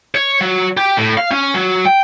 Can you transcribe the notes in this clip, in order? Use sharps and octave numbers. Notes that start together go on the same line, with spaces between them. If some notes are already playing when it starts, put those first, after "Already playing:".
C#5
F#3
G4
A2
F5
C#4
F#3
G5